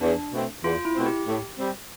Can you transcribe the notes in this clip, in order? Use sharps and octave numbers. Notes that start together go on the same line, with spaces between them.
E2 D4
B2 A3 C4
E2 F4
E4
B2 A3 C4
G4
A2
G3 C4